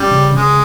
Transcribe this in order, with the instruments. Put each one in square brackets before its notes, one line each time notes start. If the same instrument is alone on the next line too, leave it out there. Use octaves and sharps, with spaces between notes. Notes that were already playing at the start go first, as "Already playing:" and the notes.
Already playing: [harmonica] G3 [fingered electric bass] C#4
[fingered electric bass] C#3
[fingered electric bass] C#3 [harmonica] G#3